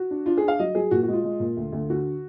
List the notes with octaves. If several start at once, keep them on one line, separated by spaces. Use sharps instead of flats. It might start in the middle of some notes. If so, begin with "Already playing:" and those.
Already playing: F#4
D4
D4 F4
D4 G#4
F5
F#3 D#5
F#3 G#4
A#2 F#4
G#3 F#4
F4
G#3
A#2
D2
D2
D3 F#4